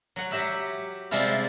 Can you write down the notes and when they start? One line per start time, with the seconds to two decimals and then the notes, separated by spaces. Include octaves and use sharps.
0.16 F#3 F#5
0.31 F#3 G4 E5 B5
1.11 C3 G3 G#3 E4 F4